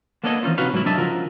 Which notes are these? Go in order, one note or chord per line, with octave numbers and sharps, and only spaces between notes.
A#3 B3 D4 A4 C#5 D#5
E3 C4 C#4 D#4 F4
C3 D#4 F#4 B4 C#5 F5
G#2 F#3 A#3 E4
C2 F#3 D4 D#5 E5 A5
C#3 F3 F4 F#4 A#4